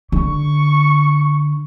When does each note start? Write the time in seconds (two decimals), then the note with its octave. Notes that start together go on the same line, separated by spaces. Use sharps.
0.12 D3 C#6